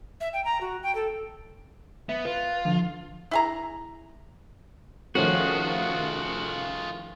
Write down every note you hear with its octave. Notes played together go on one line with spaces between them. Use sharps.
E5
G5
A#5
F#4
G5
A4
B3 E5
F4 B4
D3 F3
E4 G#4 A#5
D#3 F3 A3 C#4 F4 F#4 G#4